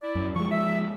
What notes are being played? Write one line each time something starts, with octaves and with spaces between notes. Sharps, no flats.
E4 D5
F#2
F3 G#3 C#6
E5